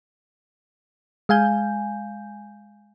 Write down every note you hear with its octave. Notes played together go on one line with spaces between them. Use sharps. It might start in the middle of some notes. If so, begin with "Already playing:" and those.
G#3 F5 G#5 G6